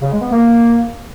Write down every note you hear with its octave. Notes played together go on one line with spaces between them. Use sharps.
C#3
G#3
B3
A#3